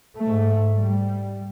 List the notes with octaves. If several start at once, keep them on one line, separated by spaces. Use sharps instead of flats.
G#2 A3
G3